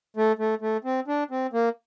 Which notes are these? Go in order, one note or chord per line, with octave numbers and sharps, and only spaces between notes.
A3
A3
A3
C4
D4
C4
A#3